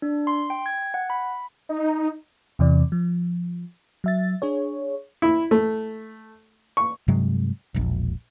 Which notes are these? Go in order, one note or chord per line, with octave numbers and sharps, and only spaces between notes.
D4
C6
G5
G#6
F#5
B5
D#4
E2 C3 E3 D5
F3
F#3 E5 A6
D4 G#4 C#5
E4
A3
C#6
G2 C3 F#3 G#3
E1 A#1